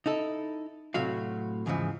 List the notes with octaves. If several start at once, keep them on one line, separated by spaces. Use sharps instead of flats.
D#4 E4 A4
A2 C3 F#3 F#4 F5
E2 G#2 C#3 E3 F3